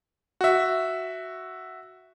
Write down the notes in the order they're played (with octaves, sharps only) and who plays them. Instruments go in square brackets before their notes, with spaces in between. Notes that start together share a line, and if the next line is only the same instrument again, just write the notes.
[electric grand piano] F#4 E5